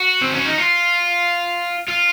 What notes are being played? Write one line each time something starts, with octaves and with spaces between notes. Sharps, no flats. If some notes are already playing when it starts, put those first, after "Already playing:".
Already playing: F#4
C4
C#4
D#4
F4
F4